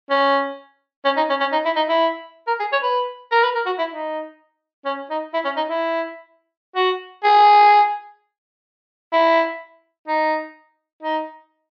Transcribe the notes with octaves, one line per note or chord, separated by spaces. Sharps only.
C#4
C#4
D#4
C#4
C#4
D#4
E4
D#4
E4
A#4
G#4
C#5
B4
A#4
B4
A#4
F#4
E4
D#4
C#4
D#4
E4
C#4
D#4
E4
F#4
G#4
E4
D#4
D#4